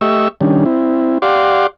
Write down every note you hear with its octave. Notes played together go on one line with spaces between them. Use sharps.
A3 G4 D#5 E5 C#6 E6
D#3 G3 C#4 D4
C4 E4
G4 D5 F5 F#5 C6 D6